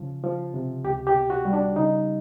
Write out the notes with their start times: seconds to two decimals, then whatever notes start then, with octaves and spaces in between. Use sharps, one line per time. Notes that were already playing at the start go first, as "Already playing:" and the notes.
Already playing: C#3 F3
0.24 F3
0.54 C3
0.84 C#2 G4
1.07 G4
1.14 B2
1.30 F#4
1.45 G3
1.53 D4
1.76 C#3 D#4